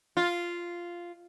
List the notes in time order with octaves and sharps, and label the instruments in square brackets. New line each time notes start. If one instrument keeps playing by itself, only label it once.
[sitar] F4